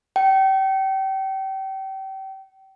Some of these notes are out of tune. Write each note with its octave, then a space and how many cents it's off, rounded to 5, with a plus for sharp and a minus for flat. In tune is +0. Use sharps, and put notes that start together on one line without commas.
G5 -30